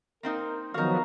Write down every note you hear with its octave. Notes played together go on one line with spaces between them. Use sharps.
A#3 C4 D#4 A#4
D#3 F3 F#3 B3 D#4 F#4 A#4 F5